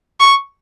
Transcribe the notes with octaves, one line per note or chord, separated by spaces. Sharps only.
C#6